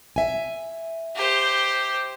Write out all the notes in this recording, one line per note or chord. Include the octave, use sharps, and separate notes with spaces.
E5 G#5
G4 C5